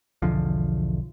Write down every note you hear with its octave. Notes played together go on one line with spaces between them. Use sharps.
B1 E2 D3 F3